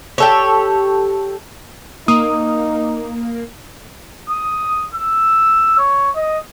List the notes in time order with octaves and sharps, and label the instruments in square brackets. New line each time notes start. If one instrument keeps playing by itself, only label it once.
[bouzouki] G4 A4 C#5
[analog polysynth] A#3 [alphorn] D#4 [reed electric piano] D#6
[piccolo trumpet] D#6
E6
C#5
D#5